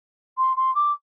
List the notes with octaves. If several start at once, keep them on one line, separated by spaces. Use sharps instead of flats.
C6
C6
D6